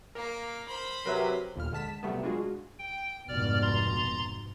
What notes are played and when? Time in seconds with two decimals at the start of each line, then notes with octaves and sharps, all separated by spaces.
0.15 A#3 A#4 D6
0.67 C5 B5
1.06 C3 F#3 A#4 B4 E5
1.56 G1 D#2 A#2 F6
1.72 D3 G#3 A5 B6 E7
2.03 C3 F#3 G3 A3 B3
2.23 G#3 D4 F4 F#4 G#4
2.79 G5
3.28 F1 G#2 B2 D5 F6
3.62 A#5 C6 A6